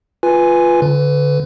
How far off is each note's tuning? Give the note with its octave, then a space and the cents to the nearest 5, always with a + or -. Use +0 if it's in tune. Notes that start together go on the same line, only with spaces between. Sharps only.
F4 +0 B4 +0 G#5 +0
D3 -25 B4 +20